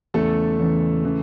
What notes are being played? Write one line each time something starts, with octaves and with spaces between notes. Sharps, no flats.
E2 C#3 E3 A3 A4
E2 C#3 E3
C#3 E3